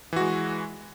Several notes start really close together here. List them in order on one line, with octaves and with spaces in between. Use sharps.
E3 F#4 G#3